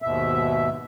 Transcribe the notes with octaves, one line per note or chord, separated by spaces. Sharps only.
D#2 G#2 B2 E5